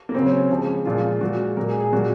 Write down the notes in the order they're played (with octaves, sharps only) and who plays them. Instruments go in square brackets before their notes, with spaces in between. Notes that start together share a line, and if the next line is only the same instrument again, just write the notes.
[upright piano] A#3
C#3 F#3 C4
C#4
C#3 F3 G#3
A#2 F3 G#3 F4
A#2 G#3 F#4
A#2 G#3 A#4
G#4
G#4
A#2 G#3 F#4